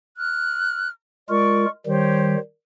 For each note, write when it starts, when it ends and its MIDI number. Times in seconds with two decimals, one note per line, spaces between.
0.18 0.89 89
0.18 0.89 90
1.29 1.65 56
1.29 1.65 65
1.29 1.65 70
1.29 1.68 74
1.29 1.68 85
1.86 2.36 51
1.86 2.36 55
1.86 2.40 67
1.86 2.40 72
1.86 2.40 73